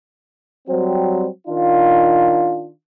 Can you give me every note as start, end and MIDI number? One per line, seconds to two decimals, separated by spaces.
0.68 1.26 54
0.68 1.26 55
0.68 1.26 60
1.47 2.70 51
1.47 2.70 62
1.47 2.70 65